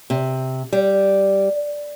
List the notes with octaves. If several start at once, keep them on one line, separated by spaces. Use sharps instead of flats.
C3
G3